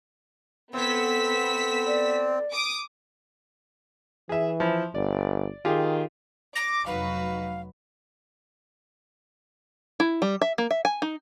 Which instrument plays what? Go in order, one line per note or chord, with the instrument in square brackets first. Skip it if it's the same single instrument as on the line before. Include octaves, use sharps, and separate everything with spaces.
[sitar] A2 A3 [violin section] B3 E6 B6 [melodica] C4
[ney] D5
[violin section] D6 D#6
[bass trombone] E3 [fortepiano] G#4 E5
[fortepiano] F3 E4
[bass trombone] G1 [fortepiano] D5
[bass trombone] D#3 [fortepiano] F4 G4 G#4
[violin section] D6 [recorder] A#6
[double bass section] F1 F#3 [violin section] D#4 F#4 B4 [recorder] F5
[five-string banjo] E4
G3
E5
A#3
E5
G#5
D#4